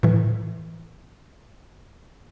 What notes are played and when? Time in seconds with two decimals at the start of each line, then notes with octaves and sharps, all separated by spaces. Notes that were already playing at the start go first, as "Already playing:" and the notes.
0.03 A2 E3